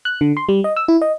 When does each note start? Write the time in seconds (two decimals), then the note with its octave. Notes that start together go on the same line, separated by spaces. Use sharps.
0.05 F#6
0.21 D3
0.37 C6
0.49 G3
0.64 D#5
0.76 E6
0.88 E4
1.02 D#5